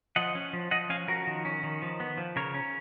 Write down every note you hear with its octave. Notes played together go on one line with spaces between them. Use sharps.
F3 D#5 F#5
C#4
F3
F3 D#5 F#5
C#4 F5 G#5
F3 F#4 A#4
D#3
C#4
D#3
F3
B3
F3
C#3 A#4 C#5
C#4